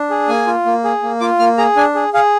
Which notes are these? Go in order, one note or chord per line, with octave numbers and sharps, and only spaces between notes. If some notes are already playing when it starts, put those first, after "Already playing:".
Already playing: D4
G#4
A#3 G#5
F4
A#3
G#4
A#3
F4 D6
A#3 F6
G#4 A#5
D4 G#5
G#4
G#4 F5